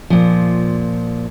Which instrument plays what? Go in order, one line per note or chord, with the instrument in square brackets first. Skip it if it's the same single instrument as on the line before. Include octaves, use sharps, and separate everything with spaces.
[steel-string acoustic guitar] A#2 F3